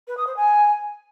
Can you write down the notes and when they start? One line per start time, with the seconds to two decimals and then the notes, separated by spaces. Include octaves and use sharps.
0.08 B4
0.17 D#6
0.27 C5
0.36 G#5